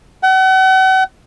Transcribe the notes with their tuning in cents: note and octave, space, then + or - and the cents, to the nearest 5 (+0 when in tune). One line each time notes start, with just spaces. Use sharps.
F#5 +40